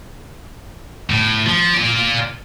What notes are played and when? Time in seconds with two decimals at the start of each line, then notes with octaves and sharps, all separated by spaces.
1.10 A2
1.47 F3
1.74 F4 D5